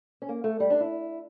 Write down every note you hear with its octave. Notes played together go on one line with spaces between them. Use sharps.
C#4
A#3
A3
G3
D4
E4